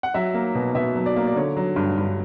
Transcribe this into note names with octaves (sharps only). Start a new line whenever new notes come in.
F#5
F#3 E5
A#3
B2
B2 E5
F#3
D5
A#3
D5
D3 C#5
F#3
G2
G2